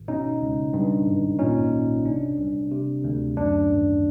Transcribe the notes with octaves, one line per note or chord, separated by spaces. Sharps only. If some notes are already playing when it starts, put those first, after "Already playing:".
Already playing: G#1
B2 C#4 D#4
C#2
G2
G#1
A#2 C#4 D#4
B1
C3 D4
C2
C3
D2
F#2 D4
G#1